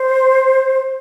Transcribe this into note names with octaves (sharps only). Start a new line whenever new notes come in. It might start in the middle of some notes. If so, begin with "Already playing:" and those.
Already playing: C5